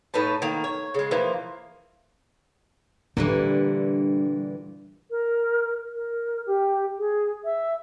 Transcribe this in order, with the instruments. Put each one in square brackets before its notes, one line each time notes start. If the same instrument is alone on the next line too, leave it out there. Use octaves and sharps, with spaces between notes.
[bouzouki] A2 D#4 B4 A5
D#3 A#3
C#5
C#3 G#3
E3 F3 A#3
[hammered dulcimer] G2 [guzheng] A#2 D3 E3 [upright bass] G3
[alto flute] A#4
A#4
G4
G#4
E5